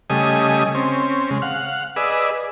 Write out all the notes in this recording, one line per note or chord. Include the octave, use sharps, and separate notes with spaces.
C#3 G3 A3 D#5 G#5 D#6
C4 C#4
C#3 G#3
F5 F#5
G#4 B4 D5 D#5 E6